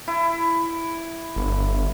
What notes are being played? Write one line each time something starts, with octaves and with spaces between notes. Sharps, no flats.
E4
G1